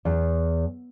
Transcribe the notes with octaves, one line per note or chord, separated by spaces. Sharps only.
E2